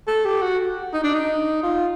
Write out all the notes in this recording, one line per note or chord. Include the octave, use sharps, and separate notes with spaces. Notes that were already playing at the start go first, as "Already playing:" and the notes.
A4
G4
F#4
D#4
D4
D#4
F4